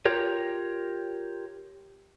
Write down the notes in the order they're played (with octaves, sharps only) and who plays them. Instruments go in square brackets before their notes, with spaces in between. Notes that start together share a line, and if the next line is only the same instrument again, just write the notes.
[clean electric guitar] F4 G4 A#4 C#5